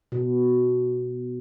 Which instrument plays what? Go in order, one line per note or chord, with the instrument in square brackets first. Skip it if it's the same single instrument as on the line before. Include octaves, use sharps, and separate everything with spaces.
[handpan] B2